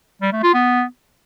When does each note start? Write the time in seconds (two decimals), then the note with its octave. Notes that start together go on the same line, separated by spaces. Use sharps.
0.22 G3
0.33 A3
0.43 F4
0.54 B3